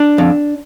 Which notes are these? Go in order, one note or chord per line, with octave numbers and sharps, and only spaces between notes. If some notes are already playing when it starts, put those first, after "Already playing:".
Already playing: D4
F2